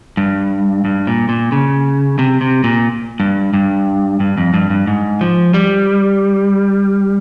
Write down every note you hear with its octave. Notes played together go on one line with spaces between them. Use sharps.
G2
G2
A#2
A#2
C#3
C3
C3
A#2
G2
G2
G2
F2
G2
G2
G#2
F3
G3